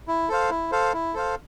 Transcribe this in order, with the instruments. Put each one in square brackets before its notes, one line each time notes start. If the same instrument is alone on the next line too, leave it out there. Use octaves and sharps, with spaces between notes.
[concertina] E4
A4 C5 F5
E4
A4 C5 F5
E4
A4 C5 F5